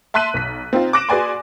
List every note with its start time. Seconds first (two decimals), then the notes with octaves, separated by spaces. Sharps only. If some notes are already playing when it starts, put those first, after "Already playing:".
0.14 E5 A5 C6 F#6 B6 D#7
0.34 B1 B6
0.73 C4 D#4 F4
0.93 D6 F#6 A#6 D7 E7
1.09 F#4 G#4 B4 D5 G#5 C6